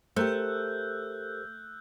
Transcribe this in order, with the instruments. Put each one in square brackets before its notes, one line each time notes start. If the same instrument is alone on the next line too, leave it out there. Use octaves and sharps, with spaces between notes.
[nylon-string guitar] A3 [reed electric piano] G4 A#4 C5 [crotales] E6 F#6 G6